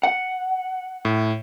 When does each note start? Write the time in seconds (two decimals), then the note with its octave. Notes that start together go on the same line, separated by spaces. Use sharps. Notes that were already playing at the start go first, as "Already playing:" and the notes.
0.03 F#5
1.05 A2